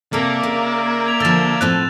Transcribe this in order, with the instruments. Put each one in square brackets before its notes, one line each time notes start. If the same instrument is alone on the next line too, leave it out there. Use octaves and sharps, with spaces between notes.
[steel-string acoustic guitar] C3 A4 [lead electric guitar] A#3 [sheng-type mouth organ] A#4 D5 E5
[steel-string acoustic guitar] C#3
[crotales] G#6 F7
[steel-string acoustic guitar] D3 F3 [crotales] E6 A6 E7
[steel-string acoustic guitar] A2 F3 C4 [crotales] F#6